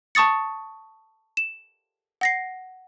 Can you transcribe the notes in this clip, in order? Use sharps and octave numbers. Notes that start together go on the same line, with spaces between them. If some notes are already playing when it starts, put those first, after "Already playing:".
A5 C#6 D#6 A6 C#7
E7
F#5 A#6 C7